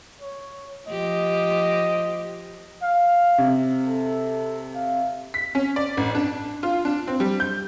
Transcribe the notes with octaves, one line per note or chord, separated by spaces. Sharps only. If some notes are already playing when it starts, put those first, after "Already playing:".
C#5
F3 G4 D#5
F5
C3
A4
F5
B6
C#4
D5
A1
D4
F4
D4
C4
G3
G6